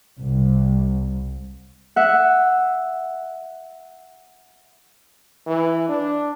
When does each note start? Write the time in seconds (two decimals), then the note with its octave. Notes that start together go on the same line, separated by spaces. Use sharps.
0.18 C2
1.96 E5 F#5
5.46 E3
5.88 D4